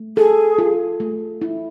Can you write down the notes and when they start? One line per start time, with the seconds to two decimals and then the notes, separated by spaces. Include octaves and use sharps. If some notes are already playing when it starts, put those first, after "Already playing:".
Already playing: A3
0.17 G#4 A4
0.58 F4
1.00 A3
1.42 E4